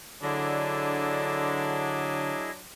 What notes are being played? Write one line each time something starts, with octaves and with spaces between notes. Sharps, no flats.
D3 F#3 D4 E4 G#4 D#5